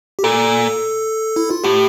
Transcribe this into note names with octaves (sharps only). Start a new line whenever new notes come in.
G4
A#2 A4
E4
F4
A2 G4